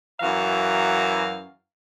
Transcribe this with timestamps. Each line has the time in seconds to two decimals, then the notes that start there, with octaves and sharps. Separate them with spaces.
0.20 F#2 E3 F#4 F5 A#5